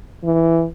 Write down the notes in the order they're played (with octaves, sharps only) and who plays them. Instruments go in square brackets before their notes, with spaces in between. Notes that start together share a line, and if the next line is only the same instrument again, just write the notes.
[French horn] E3